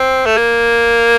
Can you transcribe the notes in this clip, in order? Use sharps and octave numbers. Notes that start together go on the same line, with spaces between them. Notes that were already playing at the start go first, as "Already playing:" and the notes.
Already playing: C4
A3
A#3